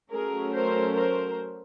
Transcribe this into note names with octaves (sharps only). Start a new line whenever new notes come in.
F#3 A3 C#4 G#4 A#4
A#4 C5
A#4 C5